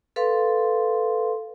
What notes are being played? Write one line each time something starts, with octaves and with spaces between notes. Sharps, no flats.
A4 B4 F5 C6